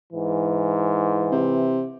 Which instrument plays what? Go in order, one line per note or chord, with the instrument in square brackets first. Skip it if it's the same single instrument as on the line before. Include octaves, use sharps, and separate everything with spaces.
[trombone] G#2 [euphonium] E3
[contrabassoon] C3